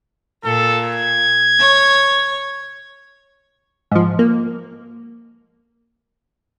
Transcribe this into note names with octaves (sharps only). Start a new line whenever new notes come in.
A#2 A4
G#6
C#5
G#2 F3
A#3